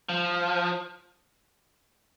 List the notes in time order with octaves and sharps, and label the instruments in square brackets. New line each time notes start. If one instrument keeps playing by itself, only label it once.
[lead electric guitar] F3